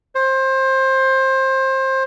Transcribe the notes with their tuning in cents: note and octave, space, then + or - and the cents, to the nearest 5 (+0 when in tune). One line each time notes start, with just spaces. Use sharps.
C5 +25